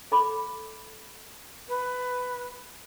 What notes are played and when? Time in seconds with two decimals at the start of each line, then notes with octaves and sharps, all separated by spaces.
0.12 A4 B5 D6
1.68 B4